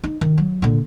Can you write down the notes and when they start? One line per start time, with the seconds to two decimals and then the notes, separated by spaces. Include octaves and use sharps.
0.04 D#4
0.21 D#3
0.38 F#3
0.62 A#2 D3